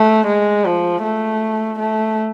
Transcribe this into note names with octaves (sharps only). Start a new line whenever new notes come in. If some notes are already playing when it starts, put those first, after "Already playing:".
Already playing: A3
G#3
F3
A3
A3